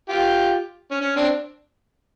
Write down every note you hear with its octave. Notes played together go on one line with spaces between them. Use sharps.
F4 G4
C#4
C#4
C4 D4